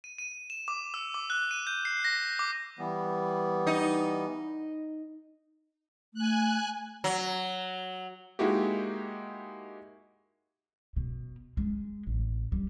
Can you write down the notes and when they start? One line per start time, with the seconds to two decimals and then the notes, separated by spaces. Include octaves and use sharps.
0.04 D#7
0.18 D#7
0.50 E7
0.68 D6
0.94 E6
1.14 D6
1.30 F#6
1.51 D#7
1.67 G6
1.85 C7
2.05 A#6
2.39 D6
2.79 E3 G3 B3
3.67 D#4
6.14 A3 G#5 F#6
7.04 F#3
8.39 G#3 A#3 D#4 E4 F#4 G4
10.96 B2
11.57 G#3
12.07 A1
12.52 G3